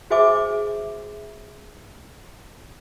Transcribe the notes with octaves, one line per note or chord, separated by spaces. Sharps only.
F#4 G#4 C5 E5 G#5 D6